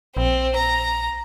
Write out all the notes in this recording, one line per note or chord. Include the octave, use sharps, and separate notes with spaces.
A#1 C4
A#5